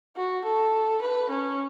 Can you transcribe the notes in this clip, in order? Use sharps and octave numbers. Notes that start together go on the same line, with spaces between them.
F#4
A4
B4
C#4